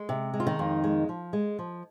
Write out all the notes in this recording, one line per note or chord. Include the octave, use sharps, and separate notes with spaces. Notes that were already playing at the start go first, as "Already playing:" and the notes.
Already playing: G#3
C3
G#3
F4
D#3 D#4
F2
G#3
F3
G#3
F3